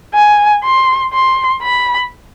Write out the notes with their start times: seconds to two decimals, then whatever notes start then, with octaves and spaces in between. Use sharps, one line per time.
0.15 G#5
0.64 C6
1.13 C6
1.63 B5